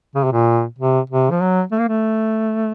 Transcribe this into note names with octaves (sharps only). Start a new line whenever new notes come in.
C#3
C3
A#2
C3
C3
F3
F#3
A3
A#3
A3